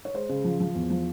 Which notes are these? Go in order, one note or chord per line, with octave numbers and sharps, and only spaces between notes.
C#5
G#3 C5
C#3
F3
F3
E2
F3